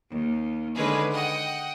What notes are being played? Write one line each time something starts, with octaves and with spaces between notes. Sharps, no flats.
D#2
D3 D#3 G#3 C#4 G#4 B4
D#5 F#5 G5